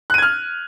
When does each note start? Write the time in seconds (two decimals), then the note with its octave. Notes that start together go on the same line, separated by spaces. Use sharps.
0.10 F#6
0.14 D#7
0.18 G#6
0.22 F6